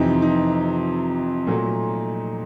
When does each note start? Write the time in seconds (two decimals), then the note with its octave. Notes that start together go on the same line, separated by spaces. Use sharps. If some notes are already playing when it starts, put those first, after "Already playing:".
Already playing: F2 C3 E3 D#4
0.22 D#4
1.47 A#2 F#3 A3